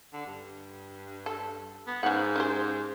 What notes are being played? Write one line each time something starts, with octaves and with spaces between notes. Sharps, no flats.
D3
G2
A4
B3
G#2 C#3 F#5
C#4 G4 C5